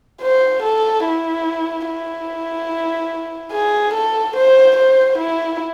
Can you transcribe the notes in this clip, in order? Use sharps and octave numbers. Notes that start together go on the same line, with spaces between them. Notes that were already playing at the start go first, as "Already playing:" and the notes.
C5
A4
E4
E4
G#4
A4
C5
C5
E4